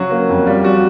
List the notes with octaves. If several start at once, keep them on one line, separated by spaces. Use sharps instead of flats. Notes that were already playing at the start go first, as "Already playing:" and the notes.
Already playing: C#3 F#3 F#4
A#3
F2
G3 F4
G3 F#4